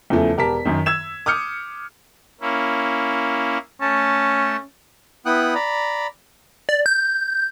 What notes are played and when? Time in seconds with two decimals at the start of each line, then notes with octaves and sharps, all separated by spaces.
0.10 E2 C#3 F3 A3
0.37 E1 G4 A#4 A5 B6
0.65 F#2 D#3
0.86 E6 G#6 E7
1.26 D6 D#6 F6 G6 C#7
2.41 A#3 C#4 E4
3.81 A3 C#4 A5
5.26 B3 E4 F#5 G5 D#6 F#6
5.55 D5 A#5 B5
6.69 D5
6.86 G6